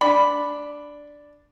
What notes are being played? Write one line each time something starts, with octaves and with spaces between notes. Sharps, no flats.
D4 B5